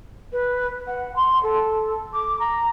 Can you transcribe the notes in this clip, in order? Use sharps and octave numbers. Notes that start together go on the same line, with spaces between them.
B4
F#5
C6
A4
D6
A#5